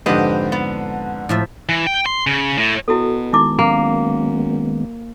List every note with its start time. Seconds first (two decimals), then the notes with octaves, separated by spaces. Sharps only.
0.06 F2 G#2 D3 G4 B4 C5 D#5
0.52 B3
1.29 A2 F3 E5
1.69 E3
1.87 G5
2.06 C6
2.27 C#3
2.58 A2
2.88 B2 E4 F#4 A4
3.33 D#3 G#3 B3 D#4 E4 D6
3.59 F#2 A#3